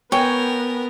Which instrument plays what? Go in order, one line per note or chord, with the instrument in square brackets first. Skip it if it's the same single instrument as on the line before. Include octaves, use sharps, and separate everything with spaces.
[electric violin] B3 [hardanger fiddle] A#4 [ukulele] C#5 [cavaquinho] G5 G#5